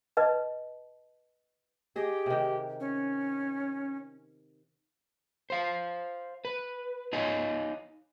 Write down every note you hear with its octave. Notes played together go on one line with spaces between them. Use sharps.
B4 D#5 A5
G4 G#4 D#5
C3 D#3
C#4
C5 F5
B4
D#4 C#5 D#5 F5 G#5